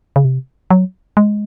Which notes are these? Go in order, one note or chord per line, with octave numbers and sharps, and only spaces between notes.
C#3
C3
F#3
G#3